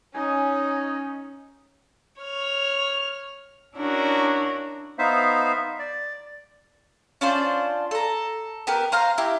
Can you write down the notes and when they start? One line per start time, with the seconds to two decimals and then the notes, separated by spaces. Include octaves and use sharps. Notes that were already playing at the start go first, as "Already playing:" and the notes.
0.15 C#4 D#4 G#5
2.21 C#5 F6
3.76 C#4 D4 E4 F#4 A#4
4.99 B3 D#4 C5 E5 F5
5.79 D5
7.21 C#4 D4 F4 C5
7.91 A4 A#5
8.67 B3 G4 A#4
8.92 C5 F5 A#5 C6
9.18 E4 G4